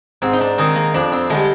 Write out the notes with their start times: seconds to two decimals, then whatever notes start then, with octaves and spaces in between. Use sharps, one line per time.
0.22 G#2 C4
0.33 D#4
0.41 D4
0.58 D#3 G#3 C4 D#4
0.76 A#3
0.94 F2 D4
1.12 C4
1.30 D3 G3 G#3